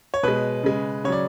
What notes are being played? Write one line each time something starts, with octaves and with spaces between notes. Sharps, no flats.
C#5
B2 G#3 B4
C#3 G#3
C#3 F#3 C#5 D5